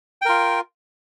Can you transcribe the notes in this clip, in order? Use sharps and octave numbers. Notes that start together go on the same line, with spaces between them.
F4 A#4 G5